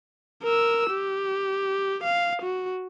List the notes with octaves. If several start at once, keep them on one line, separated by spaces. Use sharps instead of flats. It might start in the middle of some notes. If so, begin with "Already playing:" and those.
A#4 E6
G4
F5
F#4